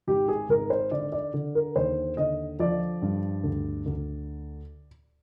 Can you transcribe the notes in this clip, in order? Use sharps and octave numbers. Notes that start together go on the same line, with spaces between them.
G#1 G4
G#4
G#1 A#4
C5
D3 D5
D5
D3
A#4
D#2 C5
D3 D#5
F3 D5
G2
D2
D2